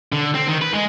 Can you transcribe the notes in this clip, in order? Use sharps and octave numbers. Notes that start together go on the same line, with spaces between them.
D3
C4
D#3
B4
G#3